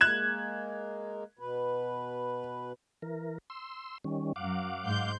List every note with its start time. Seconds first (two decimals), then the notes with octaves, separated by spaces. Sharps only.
0.01 G#3 A#3 F#6 G#6 E7
1.39 B2 B4
3.02 E3 A#4
3.50 C6 E6
4.04 D#3 G3 C#4
4.36 F#2 F#3 F5 F#5 D6
4.85 G#2 C6 G6